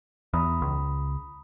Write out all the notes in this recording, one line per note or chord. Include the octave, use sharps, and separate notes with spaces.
E2 A#5 B5 D#6
C#2